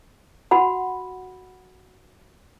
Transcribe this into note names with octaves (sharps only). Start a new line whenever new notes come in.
F#4 F#5 B5